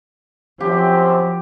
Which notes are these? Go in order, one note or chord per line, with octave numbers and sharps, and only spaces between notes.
F#2 C3 F3 C4 G4